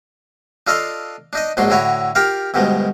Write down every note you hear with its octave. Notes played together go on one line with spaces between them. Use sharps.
D4 F4 A4 D#5 F5 C6
D4 D#4 D#5
A#1 G#2 F#3 D4 C6
A2 D3 E4 F#4 C#5
F4 G4 A#4 F5
D2 G2 B2 F3 G#3